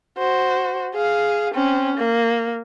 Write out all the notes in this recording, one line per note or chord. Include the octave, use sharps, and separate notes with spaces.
F#4 C5
G#4 F5
C4 C#4
A#3